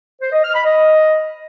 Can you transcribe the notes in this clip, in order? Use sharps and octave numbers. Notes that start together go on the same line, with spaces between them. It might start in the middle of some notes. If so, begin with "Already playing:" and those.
C5
D#5
F6
B5
D#5